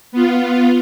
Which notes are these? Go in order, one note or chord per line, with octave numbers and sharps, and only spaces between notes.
B3 F4